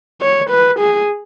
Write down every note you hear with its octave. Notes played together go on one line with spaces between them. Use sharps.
C#5
B4
G#4